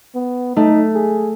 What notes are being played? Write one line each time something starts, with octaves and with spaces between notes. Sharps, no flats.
B3
A3 D#4
G#4